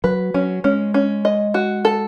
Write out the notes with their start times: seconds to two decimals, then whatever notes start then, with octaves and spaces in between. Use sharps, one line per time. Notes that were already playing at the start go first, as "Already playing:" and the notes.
0.04 F#3 B4
0.34 F#3 C#4
0.64 G#3 C#4
0.94 C#4
1.25 D#5
1.54 F#4
1.85 A4